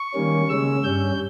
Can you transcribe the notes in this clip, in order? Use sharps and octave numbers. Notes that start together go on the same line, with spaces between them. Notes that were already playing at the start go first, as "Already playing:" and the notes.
Already playing: C#6
D#3 G3 A#3 C#4
C#3 G#3 C#4 E6
G2 G3 C#4 G6